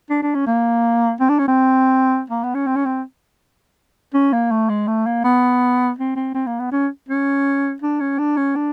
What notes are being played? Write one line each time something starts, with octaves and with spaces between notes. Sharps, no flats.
D4
D4
C#4
A#3
C4
D4
C#4
C4
A#3
B3
C#4
C4
C#4
C4
C#4
A#3
A3
G#3
A3
A#3
B3
C4
C4
C4
A#3
B3
C#4
C#4
D4
C#4
D4
C#4
D4